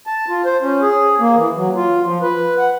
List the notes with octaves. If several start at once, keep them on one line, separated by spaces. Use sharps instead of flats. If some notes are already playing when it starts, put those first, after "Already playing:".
A5
F4
C5
C#4
G#4
A#3
E3
F#3
F4
F3
B4
F#5